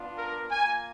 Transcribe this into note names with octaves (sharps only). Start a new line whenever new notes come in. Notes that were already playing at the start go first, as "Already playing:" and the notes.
Already playing: B3 D4 F4
A#4
A#3 F4 G#5